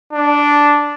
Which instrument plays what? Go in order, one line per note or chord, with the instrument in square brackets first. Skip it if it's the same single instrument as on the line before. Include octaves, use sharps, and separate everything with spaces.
[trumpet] D4